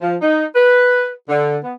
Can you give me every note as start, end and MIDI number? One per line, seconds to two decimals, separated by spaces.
0.01 0.16 53
0.21 0.46 63
0.56 1.11 71
1.29 1.58 50
1.64 1.73 59